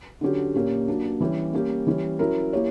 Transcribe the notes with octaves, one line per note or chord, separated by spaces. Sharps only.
D3 F#3 C#4 G4
A#2 A#3 C#4 G4
F#3 A#3 D4
E3 G3 C#4 G4
G3 A#3 C#4 G4
E3 G3 C#4
F#3 C#4 E4 A#4
A#3 E4 G4 C#5